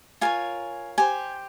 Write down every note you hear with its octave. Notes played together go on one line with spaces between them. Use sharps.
F4 A#4 C#5 G#5
G4 C5 G#5